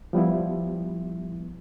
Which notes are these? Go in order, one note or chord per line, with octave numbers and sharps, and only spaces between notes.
F3 G3 B3 E4